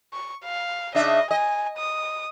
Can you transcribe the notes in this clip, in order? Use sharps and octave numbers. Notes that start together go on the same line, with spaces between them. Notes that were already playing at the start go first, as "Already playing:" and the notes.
C#6
F5
C#3 D4 D#5 E5
D#5 G#5
D#6